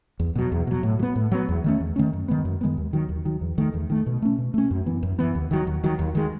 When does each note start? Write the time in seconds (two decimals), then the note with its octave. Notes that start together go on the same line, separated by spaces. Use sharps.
0.20 E2
0.35 B2 F#3
0.52 E2
0.67 B2 F#3
0.83 A2
0.99 F#3
1.03 B3
1.16 A2
1.32 F#3 B3
1.49 E2
1.64 D#3 A3 C#4
1.80 E2
1.96 D#3 A3 C#4
2.13 F#2
2.28 D#3 G#3 B3
2.45 F#2
2.61 D#3 G#3 B3
2.77 D#2
2.93 D#3 F#3
3.09 D#2
3.25 D#3 F#3
3.41 E2
3.58 D#3 A3
3.74 E2
3.90 D#3 A3
4.06 B2
4.22 A3 C#4
4.38 B2
4.54 A3 C#4
4.71 F#2
4.86 E3 B3
5.03 F#2
5.19 E3 B3
5.35 D#2
5.51 D#3 F#3
5.67 D#2
5.84 D#3 F#3
5.99 D#2
6.15 D#3 G#3